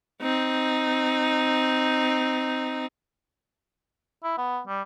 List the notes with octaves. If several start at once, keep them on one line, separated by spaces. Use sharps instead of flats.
C4 D#4
E4
B3
G3